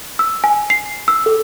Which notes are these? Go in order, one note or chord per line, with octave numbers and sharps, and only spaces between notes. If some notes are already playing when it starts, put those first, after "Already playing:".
E6
G#5
C7
E6
A4